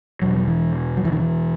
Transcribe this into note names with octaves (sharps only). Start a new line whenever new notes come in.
E2 B2 F#3
F#3
E3
F#3
E3
D#3
E3